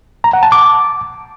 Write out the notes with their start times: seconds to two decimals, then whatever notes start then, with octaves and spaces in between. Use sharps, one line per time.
0.24 A#5
0.33 F#5
0.43 A5
0.52 D6